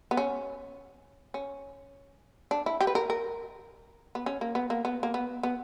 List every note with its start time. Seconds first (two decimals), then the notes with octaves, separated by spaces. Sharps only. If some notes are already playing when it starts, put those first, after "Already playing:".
0.11 B3
0.17 C#4
1.34 C#4
2.51 D4
2.66 E4
2.81 G4
2.87 B4
2.95 A#4
3.10 A#4
4.15 B3
4.26 C#4
4.41 A#3
4.55 B3
4.70 A#3
4.85 B3
5.03 A#3
5.14 B3
5.43 B3